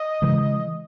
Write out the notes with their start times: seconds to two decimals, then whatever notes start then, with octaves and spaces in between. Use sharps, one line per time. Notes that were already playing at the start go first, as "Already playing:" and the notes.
Already playing: D#5
0.22 C#3 E3 G#3